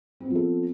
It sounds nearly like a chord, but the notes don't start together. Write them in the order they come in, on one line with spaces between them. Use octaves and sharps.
C4 B3 F3 A4